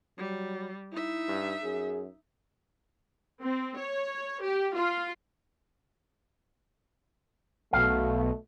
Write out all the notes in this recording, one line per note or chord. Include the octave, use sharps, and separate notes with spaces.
F#3 G3
D#4 E4 E5
G2
F#2 G#4
C4
C#5
G4
F4
B1 B2 A3 F5